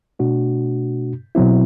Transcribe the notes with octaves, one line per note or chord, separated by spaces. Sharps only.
B2 A3 D4 F#4
B2 F#3 C4 E4